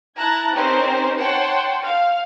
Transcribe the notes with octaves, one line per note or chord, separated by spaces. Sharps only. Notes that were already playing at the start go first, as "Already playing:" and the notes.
E4 A5 A#5 F#6 G#6
C4 C#4 D#4 G4 A#4 C5
C#5 F#5 G5 A5 C6
F5